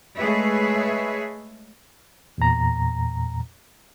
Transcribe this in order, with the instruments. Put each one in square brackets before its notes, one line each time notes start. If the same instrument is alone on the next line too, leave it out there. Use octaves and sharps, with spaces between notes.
[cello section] G#3 A3 G#4 B4 C#5 E5
[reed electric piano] E2 A#2 A#5